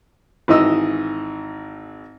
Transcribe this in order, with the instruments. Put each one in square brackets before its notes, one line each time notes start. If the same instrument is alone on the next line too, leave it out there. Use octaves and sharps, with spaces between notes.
[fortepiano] G#1 E3 D#4 D#5 E6